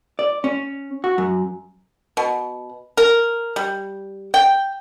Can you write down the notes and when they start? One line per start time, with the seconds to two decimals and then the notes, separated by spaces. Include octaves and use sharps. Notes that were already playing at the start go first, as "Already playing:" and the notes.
0.19 D5
0.44 C#4
1.04 F#4
1.18 F#2
2.17 B2
2.97 A#4
3.56 G3
4.34 G5